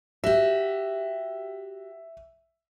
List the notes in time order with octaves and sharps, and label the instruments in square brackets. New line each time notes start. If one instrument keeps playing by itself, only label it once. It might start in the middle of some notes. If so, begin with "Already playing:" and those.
[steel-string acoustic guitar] F#4 G4 [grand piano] E5